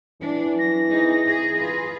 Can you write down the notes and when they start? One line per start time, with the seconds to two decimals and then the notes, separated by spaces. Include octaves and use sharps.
0.22 E3 D4
0.59 F#3 A#6
0.90 C4 D#4 G#4
1.27 G#4
1.57 F4 G#4 B4